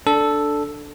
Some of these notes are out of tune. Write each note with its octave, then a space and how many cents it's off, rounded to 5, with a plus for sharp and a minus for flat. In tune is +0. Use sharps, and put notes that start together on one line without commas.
D4 +0 A4 +0